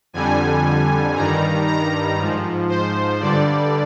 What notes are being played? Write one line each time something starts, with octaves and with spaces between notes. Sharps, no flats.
F2 D3 G3 G#5
G2 D#3 G3 A#5
A#5
G#2 F3
C5
G2 D3 G3 D5